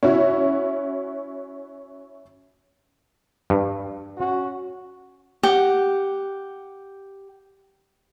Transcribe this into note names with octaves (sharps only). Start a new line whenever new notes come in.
C#4 E4 F#4
G2
C#4 F#4
G4 F#5